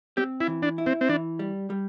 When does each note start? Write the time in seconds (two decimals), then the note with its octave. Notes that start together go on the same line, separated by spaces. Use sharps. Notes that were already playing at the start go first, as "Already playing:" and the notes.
0.17 C4 G4
0.40 E4
0.47 E3
0.62 D4
0.78 E4
0.86 C4
1.01 C4
1.09 E3 D4
1.39 G3
1.70 G3